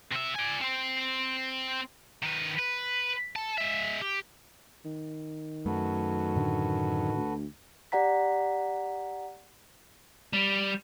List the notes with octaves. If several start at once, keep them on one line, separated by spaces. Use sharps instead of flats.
C3 E5
D5 G#5
C4 C5
D#3 B4
B4
A4 A5
G#3 E5
G4
D#3
F#2 F#3 A3 F#4 A4 B4
A2 D3 D4
D2
G4 D5 F#5 A#5 B6
G3